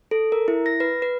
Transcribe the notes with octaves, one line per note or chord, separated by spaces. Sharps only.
A4
A#4
E4
A#6
B4
B4